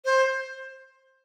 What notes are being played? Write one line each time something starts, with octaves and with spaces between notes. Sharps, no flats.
C5